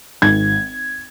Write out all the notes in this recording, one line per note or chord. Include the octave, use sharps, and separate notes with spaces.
G#1 G#6